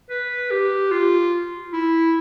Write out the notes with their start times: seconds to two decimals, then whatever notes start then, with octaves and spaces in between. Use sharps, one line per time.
0.10 B4
0.51 G4
0.91 F4
1.73 E4